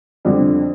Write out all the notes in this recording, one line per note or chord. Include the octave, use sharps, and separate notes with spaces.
F2 D3 G3 D4